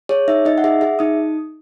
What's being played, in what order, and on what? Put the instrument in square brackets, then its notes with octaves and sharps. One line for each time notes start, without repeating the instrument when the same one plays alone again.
[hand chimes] G#4 C#5
D#4 E5
D#4 D#5
F#5
G#4 E5
G#4 E5
D#4 D#6